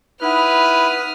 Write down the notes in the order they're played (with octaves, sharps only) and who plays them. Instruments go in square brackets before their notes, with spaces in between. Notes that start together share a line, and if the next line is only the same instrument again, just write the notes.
[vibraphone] D#4 F#5 [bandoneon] E4 [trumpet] B4 [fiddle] D#6 F6